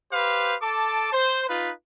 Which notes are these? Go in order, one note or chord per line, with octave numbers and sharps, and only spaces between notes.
G4 B4 C5 F5
A4 A5 D6
C5
D#4 F4 B4